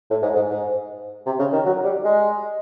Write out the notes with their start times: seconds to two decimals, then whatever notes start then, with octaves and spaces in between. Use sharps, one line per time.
0.10 A2
0.22 G#2
0.35 G#2
0.49 G#2
1.26 C3
1.39 C#3
1.53 D#3
1.65 F#3
1.84 G3
2.05 G#3